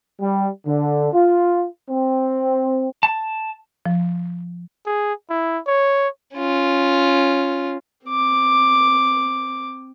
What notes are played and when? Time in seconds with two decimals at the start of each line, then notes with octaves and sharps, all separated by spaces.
0.20 G3
0.66 D3
1.13 F4
1.90 C4
3.03 A5
3.86 F3
4.86 G#4
5.31 E4
5.67 C#5
6.35 C#4 F4
8.06 C4 D6